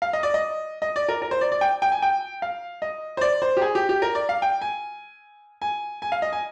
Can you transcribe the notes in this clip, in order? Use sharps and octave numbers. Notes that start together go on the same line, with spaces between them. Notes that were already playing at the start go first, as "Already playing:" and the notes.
F5
D#5
D5
D#5
D#5
D5
A#4
A#4
C5
D5
D5
G5
G5
G#5
G5
F5
D#5
C5
D5
C5
G4
G#4
G4
G4
A#4
D5
F5
G5
G#5
G#5
G#5
F5
D#5
G#5